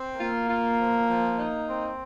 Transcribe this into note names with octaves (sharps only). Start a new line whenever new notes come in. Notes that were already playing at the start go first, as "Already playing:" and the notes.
Already playing: C4
A#3 F4
F4
F3
F3
D#4
C4